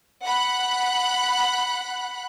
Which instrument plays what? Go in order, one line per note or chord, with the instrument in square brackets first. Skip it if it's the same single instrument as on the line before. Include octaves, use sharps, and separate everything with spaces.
[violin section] F#5 B5 F#6